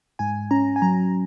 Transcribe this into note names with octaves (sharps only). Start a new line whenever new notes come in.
G#2 G#5
C#4 A#5
G#5
F#3 A#5